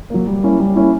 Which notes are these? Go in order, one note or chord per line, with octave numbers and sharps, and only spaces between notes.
F#3 A#3
G3
A#3 C#4 E4
G3
A#3 C#4 E4